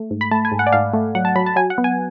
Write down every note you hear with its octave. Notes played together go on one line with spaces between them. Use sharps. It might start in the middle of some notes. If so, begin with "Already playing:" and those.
Already playing: A3
G#2
B5
A3 A5
G#5
G#2
F#5
D5
G#2 F5
A3
F#3 F#5
A5
F#3 B5
A5
F#3 G#5
F#5
B3
G#5